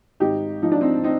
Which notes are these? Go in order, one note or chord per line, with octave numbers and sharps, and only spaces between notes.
G#1 D#4 G4
F3 D#4
D4
C4 D#4
C4 D#4